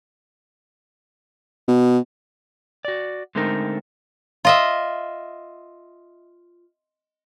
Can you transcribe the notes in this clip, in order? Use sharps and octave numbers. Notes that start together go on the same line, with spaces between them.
B2
F#4 D5
D3 G#3 A3 C4 D#4 A#4
F4 D#5 E5